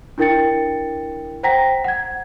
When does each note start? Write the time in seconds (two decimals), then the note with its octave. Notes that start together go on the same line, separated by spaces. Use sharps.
0.18 D4 E4 A#4 G5 A6 C#7
1.43 C5 F#5 G5 A#5 A#6 B6
1.84 F#5 G#6